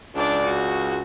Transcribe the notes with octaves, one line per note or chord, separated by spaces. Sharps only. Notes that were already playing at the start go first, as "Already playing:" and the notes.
C#2 D4 D5
F#4